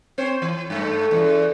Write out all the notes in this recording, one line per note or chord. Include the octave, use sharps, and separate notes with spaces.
C4 C5 C#5
E3
G2 A3
E2 A#2 C#3